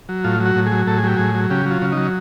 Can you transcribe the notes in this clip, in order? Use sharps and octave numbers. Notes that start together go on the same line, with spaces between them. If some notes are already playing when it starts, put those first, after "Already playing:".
F#3
A2 F4
F#3
F#4
A2
G#4
F#3
A2 A4
G#4
F#3 G4
A2 G#4
F#3
C#3 G4
F#3
F4
C#3
F#3 D#4